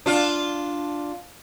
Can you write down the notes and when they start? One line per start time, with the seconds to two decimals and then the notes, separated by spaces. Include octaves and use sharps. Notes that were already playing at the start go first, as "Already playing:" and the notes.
0.06 D4 F4